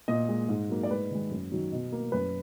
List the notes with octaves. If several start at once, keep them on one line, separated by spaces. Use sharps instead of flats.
A#2 D#5
G#3
G#2
F#3 A#3
D5
G#2 B4
D#3 G#3
F#2
D#3 F#3
B2
A#3
F#2 B4